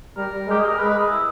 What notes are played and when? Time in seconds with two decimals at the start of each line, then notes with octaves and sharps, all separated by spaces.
0.17 G3 A#4
0.47 G#3 G4
0.60 G#4
0.68 A#4
0.78 G#3 B4
0.89 B4
0.98 G#4
1.09 E4